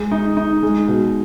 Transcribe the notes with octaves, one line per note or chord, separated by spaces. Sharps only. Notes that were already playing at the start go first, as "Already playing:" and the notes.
Already playing: G#3
D#4
D#4
G#3
B2